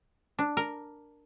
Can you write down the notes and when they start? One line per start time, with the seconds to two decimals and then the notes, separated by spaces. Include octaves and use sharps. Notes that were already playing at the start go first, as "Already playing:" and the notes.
0.39 D4
0.57 A#4